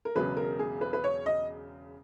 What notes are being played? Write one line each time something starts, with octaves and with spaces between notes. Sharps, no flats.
A#4
E1 E2 C#3 F#3 B4
A#4
G#4
B4
B4
C#5
D#5